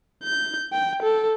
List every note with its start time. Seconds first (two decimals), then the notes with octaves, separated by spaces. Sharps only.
0.23 G6
0.72 G5
1.03 A4